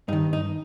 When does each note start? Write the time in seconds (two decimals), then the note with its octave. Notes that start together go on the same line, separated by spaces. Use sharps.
0.08 G2 D#4
0.13 D#3
0.33 D#4